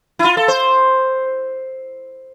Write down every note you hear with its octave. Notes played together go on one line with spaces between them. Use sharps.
E4
F4
A4
C5